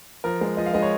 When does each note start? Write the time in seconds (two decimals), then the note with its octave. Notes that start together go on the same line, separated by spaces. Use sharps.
0.24 F3 A#4
0.41 G#3
0.57 F3 D#5
0.66 F5
0.73 G#3 D#5
0.83 C#5